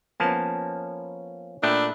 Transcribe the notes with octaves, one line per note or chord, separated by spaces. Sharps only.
F3 A#3 B3 C#4 A5
A#2 A3 D4 E5 G5 B5 D#6